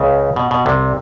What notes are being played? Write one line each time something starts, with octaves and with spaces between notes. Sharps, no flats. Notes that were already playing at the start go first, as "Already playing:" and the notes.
Already playing: C#2 C#3
B2
B2
C2 C3